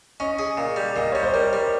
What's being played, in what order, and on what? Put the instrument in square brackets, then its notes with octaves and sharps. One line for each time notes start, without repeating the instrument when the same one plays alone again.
[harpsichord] C#4 [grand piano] D#5
[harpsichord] G#4
A#2
G3
[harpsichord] A#2 [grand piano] D#5
[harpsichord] G3 [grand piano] C#5
[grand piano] C5
[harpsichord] G3 [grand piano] A#4
[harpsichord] G3